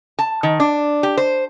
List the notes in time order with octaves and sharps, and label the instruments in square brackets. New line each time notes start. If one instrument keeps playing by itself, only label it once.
[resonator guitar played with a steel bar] A5
D#3
D4
G4
C5